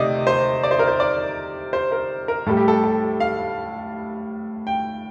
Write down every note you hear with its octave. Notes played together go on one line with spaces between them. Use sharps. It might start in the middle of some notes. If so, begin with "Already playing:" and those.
Already playing: C3 D#3 A3 D5 D#5
C5
D5
C5
A#4
C5
D5
C5
A#4
A#4
A2 G3 A4
G4
A4
A4
F5
G5